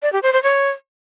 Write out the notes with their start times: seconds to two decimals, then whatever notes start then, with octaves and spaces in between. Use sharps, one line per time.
0.02 D5
0.12 G4
0.23 C5
0.33 C5
0.43 C#5